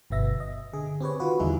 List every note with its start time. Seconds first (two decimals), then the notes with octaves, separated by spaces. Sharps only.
0.10 G1 B2 B3 E5 A#6
0.40 D#5
0.73 D3 G#4
1.00 C4 G4 B4 C#5
1.20 D#3 F4 F#4 B4
1.39 E2 D3 G3 D#4 E4 G#4